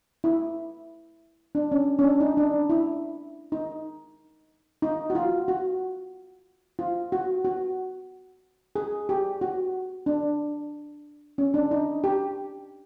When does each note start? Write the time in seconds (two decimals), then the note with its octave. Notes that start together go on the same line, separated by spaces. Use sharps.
0.24 E4
1.55 D4
1.72 C#4
1.99 C#4
2.04 D4
2.20 D#4
2.37 D4
2.70 E4
3.52 D#4
4.82 D#4
5.10 F#4
5.15 F4
5.48 F#4
6.79 F4
7.12 F#4
7.45 F#4
8.76 G#4
9.09 G4
9.41 F#4
10.06 D4
11.38 C#4
11.54 D4
11.71 D#4
12.04 G4